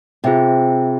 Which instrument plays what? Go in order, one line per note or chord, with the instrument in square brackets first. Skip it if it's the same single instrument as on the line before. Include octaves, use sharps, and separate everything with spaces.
[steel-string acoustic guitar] C3 [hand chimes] F4 G#4 C5 E5 G5